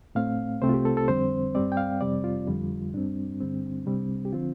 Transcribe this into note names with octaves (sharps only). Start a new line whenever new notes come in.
A2 A3 C4 F5
C2 C3 A3 C4 C5
F4
G4
A4
A4
F2 D3 G3 C4 C5
G2 G3 C4 D5
G5
F5
F2 C3 G3 C4 D5
F4
F2 D3 G3
G2 G3 C4 D4
G2 D3 G3 C4
C2 C3 G3 C4
G4
D3 F3 C4 F4